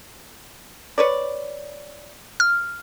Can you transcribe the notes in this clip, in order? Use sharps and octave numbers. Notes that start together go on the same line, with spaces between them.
B4 C#5 D5
F6